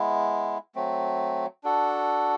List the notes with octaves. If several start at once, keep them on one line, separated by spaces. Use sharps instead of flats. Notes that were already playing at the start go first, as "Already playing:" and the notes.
Already playing: G#3 B3 E4
F#3 A3 C4
D4 F#4 A4